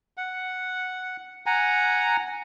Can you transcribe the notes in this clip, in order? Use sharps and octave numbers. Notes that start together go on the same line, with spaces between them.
F#5
F#5 G#5 A#5